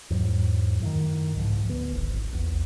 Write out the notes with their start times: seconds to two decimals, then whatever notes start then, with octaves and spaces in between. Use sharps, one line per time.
0.10 E2 G#2 F#3
0.81 F#2 A2 C3 D#3
1.35 C2 G#2 C#3 F3
1.65 D2 B3
1.93 D1 G#1
2.32 A#1 E2